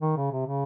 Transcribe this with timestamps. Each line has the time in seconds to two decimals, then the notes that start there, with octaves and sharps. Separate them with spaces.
0.01 D#3
0.16 C#3
0.32 C3
0.46 C#3